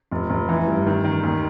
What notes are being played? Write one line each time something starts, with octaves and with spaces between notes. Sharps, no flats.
F1
F1
E3
G2
D#3
D#3
D#2